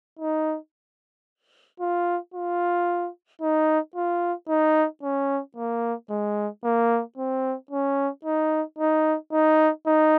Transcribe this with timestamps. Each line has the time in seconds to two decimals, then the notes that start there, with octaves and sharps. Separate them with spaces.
0.19 D#4
1.80 F4
2.34 F4
3.42 D#4
3.96 F4
4.49 D#4
5.03 C#4
5.56 A#3
6.10 G#3
6.64 A#3
7.18 C4
7.71 C#4
8.25 D#4
8.79 D#4
9.33 D#4
9.87 D#4